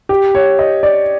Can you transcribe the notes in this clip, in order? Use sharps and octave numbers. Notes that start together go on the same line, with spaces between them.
G4
C#5
D#5
D5